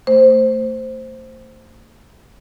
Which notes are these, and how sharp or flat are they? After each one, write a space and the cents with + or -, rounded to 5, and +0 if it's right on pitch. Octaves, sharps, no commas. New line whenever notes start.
A3 +30 C5 +0